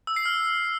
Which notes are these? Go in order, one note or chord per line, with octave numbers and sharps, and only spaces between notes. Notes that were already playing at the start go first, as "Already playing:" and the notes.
E6
C7
F6